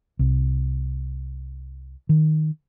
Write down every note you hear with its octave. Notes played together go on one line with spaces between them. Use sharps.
C2
D#3